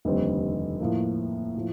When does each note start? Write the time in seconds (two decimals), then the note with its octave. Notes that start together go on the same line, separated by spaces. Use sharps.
0.05 F1 D#2 D3 G3 C4
0.80 A2 F3 A#3
1.56 A2 F3